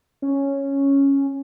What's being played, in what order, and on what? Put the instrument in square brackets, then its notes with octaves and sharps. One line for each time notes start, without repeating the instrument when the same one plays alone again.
[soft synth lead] C#4